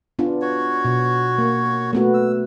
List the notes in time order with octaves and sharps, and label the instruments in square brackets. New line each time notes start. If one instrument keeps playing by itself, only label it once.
[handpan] B3 D4 F4
[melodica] F#4 C#5
[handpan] B2
A#3
A3 B3 F#4
[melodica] E6